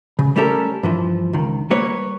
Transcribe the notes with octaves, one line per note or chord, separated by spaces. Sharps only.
C#3
G3 A3 C#4 G4 A4 A#4
G2 E3 F3
C#2 D#3
G3 A#3 B4 C#5